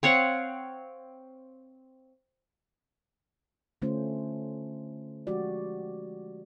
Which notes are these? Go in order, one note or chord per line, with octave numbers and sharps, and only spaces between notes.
C4 C#5 F5 F#5
D3 A3 C#4 F4 C5
F3 G#3 F#4 G4 D5